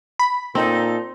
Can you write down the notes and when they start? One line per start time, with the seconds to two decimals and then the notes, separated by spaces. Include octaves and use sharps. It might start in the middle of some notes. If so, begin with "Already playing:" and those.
0.19 B5
0.55 A#2 C4 D#4 A4